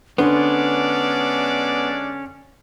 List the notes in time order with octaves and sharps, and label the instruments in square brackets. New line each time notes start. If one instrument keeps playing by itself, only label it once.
[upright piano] D3 [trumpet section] G#3 D4 D5 [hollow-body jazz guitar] B3 C5 [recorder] C#4